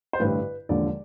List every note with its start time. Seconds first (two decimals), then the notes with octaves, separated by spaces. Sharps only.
0.13 C5
0.19 A1 G2 D3 B4
0.69 E1 D#2 D3 F3 D5